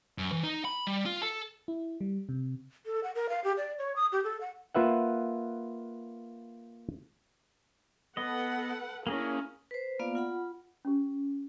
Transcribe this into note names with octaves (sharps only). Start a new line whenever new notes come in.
F#2
E3
D#4
B5
G3
F4
A4
E4
G3
C3
A4
F#5
A#4
F5
G4
D5
C#5
D#6
G4
A4
F#5
A#3 F4 B4 E5 F#5
B3 A4 B4 D#5 F#5
A#3 C#4 D4 E4 G#4 A#4
B4 C5
A#3 B3 F4 D5 F5
F4 F#5 B5
C#4 G4